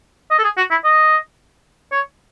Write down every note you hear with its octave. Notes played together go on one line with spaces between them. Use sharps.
D#5
A4
G#4
F#4
E4
D#5
C#5